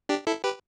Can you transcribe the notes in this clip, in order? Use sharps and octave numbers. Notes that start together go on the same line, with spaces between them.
D4 G4
E4 A4
G4 B4